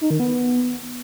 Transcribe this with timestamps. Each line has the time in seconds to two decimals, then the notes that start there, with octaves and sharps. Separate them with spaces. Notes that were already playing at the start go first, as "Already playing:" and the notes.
0.01 D#4
0.10 D#3
0.20 B3